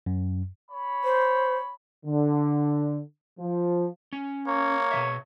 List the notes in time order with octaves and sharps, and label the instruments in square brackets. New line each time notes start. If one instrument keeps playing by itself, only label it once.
[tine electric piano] F#2
[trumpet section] C#5 B5
[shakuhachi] C5
[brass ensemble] D3
F3
[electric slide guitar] C#4
[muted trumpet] A#3 [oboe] C#5
[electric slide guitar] B2 D#3 E5